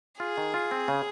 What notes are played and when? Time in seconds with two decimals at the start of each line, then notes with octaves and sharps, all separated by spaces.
0.20 F4 G#4
0.38 D#3
0.54 F4
0.71 C4
0.88 C#3